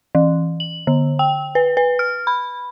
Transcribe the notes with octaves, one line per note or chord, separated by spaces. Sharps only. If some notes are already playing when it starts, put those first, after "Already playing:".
E3
F#7
D3
G5
B4
B4
F6
B5